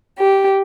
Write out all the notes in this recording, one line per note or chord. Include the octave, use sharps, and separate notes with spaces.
G4